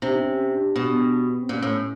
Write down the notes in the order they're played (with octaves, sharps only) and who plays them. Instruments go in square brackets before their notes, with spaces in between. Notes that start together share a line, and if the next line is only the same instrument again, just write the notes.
[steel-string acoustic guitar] C3 [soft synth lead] D4
[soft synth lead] D#4
D4
C#4
D4
[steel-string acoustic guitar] B2
[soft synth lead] C4
[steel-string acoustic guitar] A#2 [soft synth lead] C#4
[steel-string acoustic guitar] A2